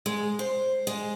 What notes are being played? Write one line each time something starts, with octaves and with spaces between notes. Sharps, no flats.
G#3
C5
G#3